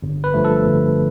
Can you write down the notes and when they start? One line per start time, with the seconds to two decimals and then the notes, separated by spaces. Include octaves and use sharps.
0.03 G1
0.24 B4
0.34 G2 F3 A3
0.45 A4
0.66 G1